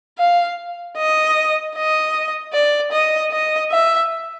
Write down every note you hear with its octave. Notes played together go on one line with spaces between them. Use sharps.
F5
D#5
D#5
D5
D#5
D#5
E5